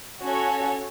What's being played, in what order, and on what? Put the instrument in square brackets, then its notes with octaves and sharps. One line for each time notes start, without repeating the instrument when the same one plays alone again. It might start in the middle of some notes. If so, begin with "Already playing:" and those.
[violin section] C#4 F#4 A4 C#5